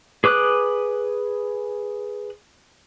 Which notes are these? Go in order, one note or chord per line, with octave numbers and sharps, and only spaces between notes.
G#4 B4 D6 D#6 F#6